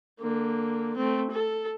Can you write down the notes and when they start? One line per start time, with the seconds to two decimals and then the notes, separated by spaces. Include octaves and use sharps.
0.20 D3 A#3
0.97 A3 C4
1.31 A4